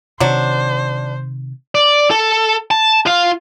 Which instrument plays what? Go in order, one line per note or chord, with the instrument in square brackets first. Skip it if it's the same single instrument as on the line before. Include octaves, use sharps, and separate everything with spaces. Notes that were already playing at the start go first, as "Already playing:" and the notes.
[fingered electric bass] C3 D#3 [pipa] F#3 D4 [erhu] C5
[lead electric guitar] D5
A4
A5
F4 F5